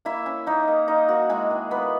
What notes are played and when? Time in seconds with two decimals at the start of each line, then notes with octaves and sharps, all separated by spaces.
0.05 A#3 E4 E5
0.26 C#4
0.46 A#3 D#4 D#5
0.68 A#3
0.88 A#3 D#4 D#5
1.08 A#3 F#4
1.29 G#3 E4 G#4
1.50 D#3
1.71 A#3 B3 B4